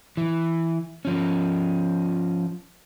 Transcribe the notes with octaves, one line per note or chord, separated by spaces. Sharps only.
E3
F3 C#4